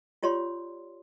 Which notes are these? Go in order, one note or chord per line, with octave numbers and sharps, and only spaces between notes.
F4 G4 C#5 D5 C6